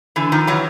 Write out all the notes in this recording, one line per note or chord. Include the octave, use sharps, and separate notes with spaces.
D3 E3
D#3 F3
E3 F#3